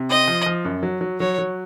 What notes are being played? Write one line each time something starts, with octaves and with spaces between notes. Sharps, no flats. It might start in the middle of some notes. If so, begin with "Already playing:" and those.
Already playing: C3
C4 D#5
F3
F3
F#2
F#3
F#3
F#3 C#5
F#3